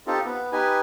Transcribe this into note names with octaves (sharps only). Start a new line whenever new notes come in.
C4 D#4 F4 G4 A4
B3
D#4 G4 B4 G#5